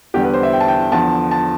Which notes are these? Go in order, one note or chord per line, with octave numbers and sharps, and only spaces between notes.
E2 D3 G3 B3 G4
B4
C5
E5
G5
A5
G5
E2 D3 F3 A5
A5